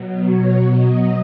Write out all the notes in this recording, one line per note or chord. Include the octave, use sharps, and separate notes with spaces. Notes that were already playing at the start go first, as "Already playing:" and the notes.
Already playing: B2 F#3
C#5
D#5